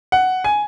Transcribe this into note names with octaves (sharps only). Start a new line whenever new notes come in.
F#5
G#5